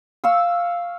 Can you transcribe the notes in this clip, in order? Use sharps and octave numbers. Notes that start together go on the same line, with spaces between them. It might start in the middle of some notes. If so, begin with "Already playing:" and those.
F5 C#6 E6